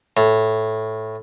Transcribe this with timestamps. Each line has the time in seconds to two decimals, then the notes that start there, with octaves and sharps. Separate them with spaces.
0.17 A2